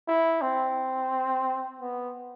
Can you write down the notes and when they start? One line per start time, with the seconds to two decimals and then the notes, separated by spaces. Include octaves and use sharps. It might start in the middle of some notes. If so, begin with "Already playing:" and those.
0.08 E4
0.42 C4
1.80 B3